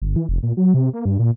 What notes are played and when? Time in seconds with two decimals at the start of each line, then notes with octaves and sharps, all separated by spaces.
0.02 G1
0.16 E3
0.29 F1
0.43 A#2
0.57 F#3
0.74 C3
0.93 A#3
1.05 G2
1.19 A#2